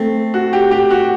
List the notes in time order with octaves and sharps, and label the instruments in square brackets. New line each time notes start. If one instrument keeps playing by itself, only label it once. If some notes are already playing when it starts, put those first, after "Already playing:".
Already playing: [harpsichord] A3 C4
[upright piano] F#4
G4
G4
F#4